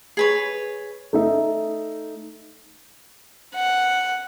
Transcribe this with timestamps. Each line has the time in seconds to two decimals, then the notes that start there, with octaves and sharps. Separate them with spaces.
0.17 G#4 B4 C#5
1.13 A3 D#4 E5
3.55 F#5